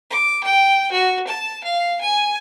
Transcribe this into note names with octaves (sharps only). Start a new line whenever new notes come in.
D6
G5
F#4
A5
F5
G#5